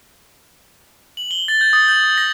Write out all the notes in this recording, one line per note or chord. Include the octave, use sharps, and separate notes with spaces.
F#7
G7
A6
G6
D#6
G6
D#6
A#6